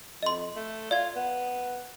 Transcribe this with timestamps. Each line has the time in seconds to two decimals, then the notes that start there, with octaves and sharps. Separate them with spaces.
0.23 F2 D#5 C6
0.55 A3
0.91 F4 D5 G#6
1.16 B3